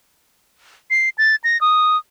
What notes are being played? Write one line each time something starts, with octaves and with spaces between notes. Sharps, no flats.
C7
A6
A#6
D#6